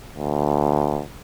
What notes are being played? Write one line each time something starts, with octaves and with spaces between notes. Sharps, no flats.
D2